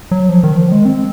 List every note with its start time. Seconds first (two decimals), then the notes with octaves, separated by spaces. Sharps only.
0.11 F#3
0.29 F3
0.43 D#3
0.57 F3
0.72 G#3
0.85 C4